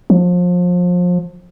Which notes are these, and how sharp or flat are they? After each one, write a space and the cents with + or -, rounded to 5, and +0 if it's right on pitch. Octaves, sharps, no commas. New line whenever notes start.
F3 +30